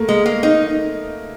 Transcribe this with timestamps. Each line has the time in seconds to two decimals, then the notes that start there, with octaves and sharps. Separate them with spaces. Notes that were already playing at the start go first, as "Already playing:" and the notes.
Already playing: A3 A#3
0.09 G#3
0.26 A#3
0.43 D#4